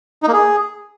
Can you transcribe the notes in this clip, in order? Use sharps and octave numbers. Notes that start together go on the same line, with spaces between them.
D#4
A#3
G#4